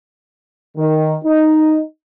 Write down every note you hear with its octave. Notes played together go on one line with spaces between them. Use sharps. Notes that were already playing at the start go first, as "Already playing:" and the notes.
D#3
D#4